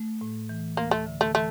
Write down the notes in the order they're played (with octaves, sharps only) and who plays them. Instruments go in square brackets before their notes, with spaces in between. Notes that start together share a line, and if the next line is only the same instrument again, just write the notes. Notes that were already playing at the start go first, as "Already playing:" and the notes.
Already playing: [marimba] A3
A2
E3
[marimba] D2 [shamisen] A#3
[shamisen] A3
[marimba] D3
[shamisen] A3
[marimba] E3 [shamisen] A3